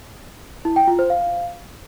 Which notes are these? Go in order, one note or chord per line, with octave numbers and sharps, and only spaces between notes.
E4
G5
F4
C5
F5